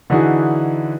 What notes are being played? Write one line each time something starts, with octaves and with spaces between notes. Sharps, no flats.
D3 E3 D#4 E4 F#4 G#4